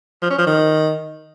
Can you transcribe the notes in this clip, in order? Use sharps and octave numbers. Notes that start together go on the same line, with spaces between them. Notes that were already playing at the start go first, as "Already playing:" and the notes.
F3
C#4
F3
D#3